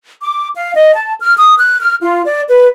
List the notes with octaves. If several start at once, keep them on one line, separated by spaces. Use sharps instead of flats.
D6
F5
D#5
A5
F6
D#6
F#6
F6
F4
D5
B4